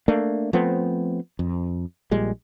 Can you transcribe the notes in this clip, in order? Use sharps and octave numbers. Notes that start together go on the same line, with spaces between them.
A3 A#3 D4
F3 A3 B3 C4
F2
A#1 A#2 G3 G#3